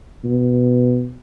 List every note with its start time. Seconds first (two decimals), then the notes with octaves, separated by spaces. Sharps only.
0.24 B2